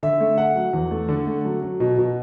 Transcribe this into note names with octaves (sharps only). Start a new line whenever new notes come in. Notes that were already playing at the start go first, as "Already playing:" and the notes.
D3 E5
A3
A3 F#5
F#3
E2
A3
D3
A3
F#3
F#3
B2
B2